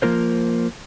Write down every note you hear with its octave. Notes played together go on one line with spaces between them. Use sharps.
F3 A#3 F4 A#4 C5